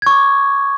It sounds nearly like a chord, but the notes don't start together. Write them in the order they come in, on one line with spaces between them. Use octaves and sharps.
G#6 C#6 D6